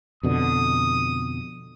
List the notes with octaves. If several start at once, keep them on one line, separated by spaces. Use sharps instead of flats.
F2 B2 D3 D#6